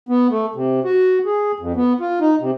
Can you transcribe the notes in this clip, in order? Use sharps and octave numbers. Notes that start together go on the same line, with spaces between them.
B3
A3
C3
F#4
G#4
F2
B3
F4
D#4
C3